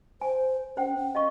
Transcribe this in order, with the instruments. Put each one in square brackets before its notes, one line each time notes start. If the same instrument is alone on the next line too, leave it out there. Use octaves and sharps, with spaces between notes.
[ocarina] C5 [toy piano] G#5
[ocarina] C#4 [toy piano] C5 F#5 G5
[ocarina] C#4
[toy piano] D#5 F5 C#6